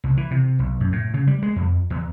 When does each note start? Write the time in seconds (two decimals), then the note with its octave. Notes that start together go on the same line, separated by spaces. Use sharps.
0.04 C2
0.17 E3
0.31 C3
0.59 B1
0.80 F#2
0.92 A2
1.14 C#3
1.27 G3
1.42 G#3
1.56 F2
1.90 E2